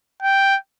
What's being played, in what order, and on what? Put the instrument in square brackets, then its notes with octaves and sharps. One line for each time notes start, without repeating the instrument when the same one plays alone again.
[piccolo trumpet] G5